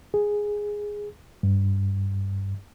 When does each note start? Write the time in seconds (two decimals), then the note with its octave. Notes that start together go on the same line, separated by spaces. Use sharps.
0.14 G#4
1.43 G2